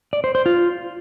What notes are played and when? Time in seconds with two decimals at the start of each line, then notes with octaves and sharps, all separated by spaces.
0.13 D5
0.24 C5
0.35 C5
0.46 F4